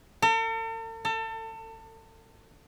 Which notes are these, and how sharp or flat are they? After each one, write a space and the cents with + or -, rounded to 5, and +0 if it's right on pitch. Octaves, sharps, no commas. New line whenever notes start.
A4 +45
A4 +30